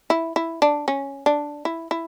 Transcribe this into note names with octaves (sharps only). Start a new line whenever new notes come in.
E4
E4
D4
C#4
D4
E4
E4